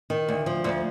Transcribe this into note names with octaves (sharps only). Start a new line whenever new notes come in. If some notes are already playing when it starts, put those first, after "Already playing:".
D#3
D2
F3
D2